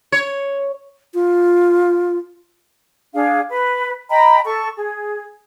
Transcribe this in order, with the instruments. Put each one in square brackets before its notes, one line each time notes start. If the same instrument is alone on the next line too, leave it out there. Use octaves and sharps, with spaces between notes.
[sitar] C#5
[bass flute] F4
[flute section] D4 G#4 F5
B4
D#5 G5 A#5 B5
A4 C#6
G#4